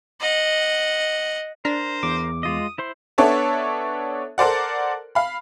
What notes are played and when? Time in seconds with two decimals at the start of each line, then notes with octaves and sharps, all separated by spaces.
0.20 D#5 F#5
1.65 D4 A#4 C5
2.03 E2 D6
2.43 G#3 F4 D#5 D#6
2.78 E4 C5 C6
3.18 B3 D4 A4 C#5 E5 A5
4.38 A4 A#4 C5 D5 F#5
5.15 F5 B5